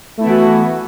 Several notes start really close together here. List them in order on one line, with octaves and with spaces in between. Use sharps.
A3 E4 B3 E3 F#4